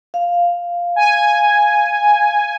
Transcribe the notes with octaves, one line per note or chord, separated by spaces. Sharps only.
F5
G#5